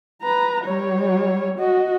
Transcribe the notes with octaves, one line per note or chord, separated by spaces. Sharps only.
B4 A#5
G3 C#5
F#4 D#5